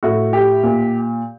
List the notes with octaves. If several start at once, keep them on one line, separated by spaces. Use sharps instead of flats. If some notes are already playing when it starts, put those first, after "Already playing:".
A2 F#4
G4
A#2